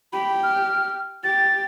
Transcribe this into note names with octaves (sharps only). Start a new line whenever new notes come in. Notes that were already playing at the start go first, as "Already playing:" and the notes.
G4 B5
F6
G4 A6